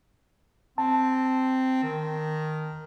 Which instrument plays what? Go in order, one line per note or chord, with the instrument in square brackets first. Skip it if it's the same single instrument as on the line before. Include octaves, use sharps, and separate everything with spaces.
[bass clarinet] C4 [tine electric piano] A5
[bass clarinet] D#3